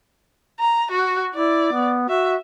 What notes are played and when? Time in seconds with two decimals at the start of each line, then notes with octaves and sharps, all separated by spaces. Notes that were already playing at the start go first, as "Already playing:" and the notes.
0.60 A#5
0.91 F#4
1.35 E4 D5
1.72 B3
2.09 F#4 E5